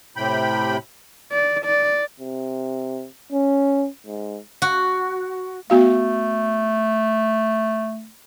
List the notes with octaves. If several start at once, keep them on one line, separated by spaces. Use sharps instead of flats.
A2 C3 G5 B5
D5
D5
C3
C#4
G#2
F#4
A3 B3 F#4 F5